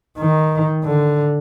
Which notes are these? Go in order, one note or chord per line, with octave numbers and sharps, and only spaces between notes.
D#3
D3